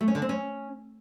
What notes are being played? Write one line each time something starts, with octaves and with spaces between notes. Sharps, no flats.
A3
C#4
D3
C4
C#4